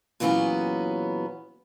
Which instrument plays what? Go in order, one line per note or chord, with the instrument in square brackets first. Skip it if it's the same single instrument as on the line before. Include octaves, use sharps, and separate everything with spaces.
[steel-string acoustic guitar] A#2 E3 F#3 B3 C#4 G#4